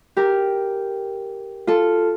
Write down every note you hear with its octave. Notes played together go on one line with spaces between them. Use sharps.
G4 A#4
F4 A4